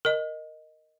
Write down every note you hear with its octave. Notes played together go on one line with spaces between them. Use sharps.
A#4 D#5